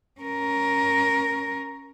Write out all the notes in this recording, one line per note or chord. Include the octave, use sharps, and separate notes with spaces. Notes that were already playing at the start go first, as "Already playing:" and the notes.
C#4 A#4